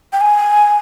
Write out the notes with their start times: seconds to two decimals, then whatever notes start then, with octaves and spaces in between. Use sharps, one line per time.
0.13 G5
0.21 G#5